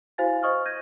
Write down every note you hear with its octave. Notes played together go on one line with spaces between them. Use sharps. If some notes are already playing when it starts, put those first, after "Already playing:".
E4 F#4 C5 F5 G#5 A6
C5 D#5 C#6 D#6 F6
G6 G#6 A#6 D#7